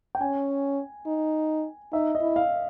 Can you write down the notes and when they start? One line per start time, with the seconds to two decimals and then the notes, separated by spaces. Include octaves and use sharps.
0.15 G5
0.21 C#4 G#5
1.06 D#4
1.93 D#4 E5
2.15 D#5
2.21 E4
2.36 F5